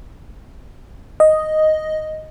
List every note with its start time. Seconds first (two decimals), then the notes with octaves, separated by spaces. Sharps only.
1.20 D#5